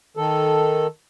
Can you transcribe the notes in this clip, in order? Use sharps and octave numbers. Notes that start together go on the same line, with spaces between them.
D#3 A4